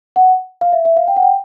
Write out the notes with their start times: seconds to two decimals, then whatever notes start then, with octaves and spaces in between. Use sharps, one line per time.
0.16 F#5
0.61 F5
0.72 E5
0.85 E5
0.97 F5
1.08 G5
1.16 F#5
1.23 G5